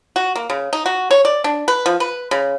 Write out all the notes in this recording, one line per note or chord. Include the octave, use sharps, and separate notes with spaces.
F#4
A#3
C#3
D#4
F#4
C#5
D5
D4
B4
F3
B4
C#3